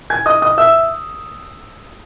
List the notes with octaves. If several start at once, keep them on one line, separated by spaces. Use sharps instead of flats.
G#5 G#6
D#5 D#6
D#5 D#6
E5 E6